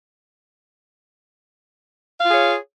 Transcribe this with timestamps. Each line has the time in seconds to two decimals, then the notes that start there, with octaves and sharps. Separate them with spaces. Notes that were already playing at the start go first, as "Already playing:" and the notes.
2.20 F5
2.24 F4
2.29 G#4
2.34 C#5